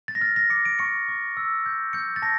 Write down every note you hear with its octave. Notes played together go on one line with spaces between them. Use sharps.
A6
A#6
F6 A6
A#6
D6 C#7
D7
C#6 C#7
C#6
E6
G6
G6 C#7
A6
A5 A#6